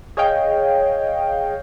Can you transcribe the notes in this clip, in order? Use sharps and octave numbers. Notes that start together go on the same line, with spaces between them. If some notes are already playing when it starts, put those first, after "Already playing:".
G#4 C#5 D#5 F5 G5